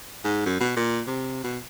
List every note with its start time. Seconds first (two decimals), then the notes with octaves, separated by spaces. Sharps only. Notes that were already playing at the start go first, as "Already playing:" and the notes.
0.24 G#2
0.46 F#2
0.60 B2
0.77 A#2
1.07 C3
1.44 B2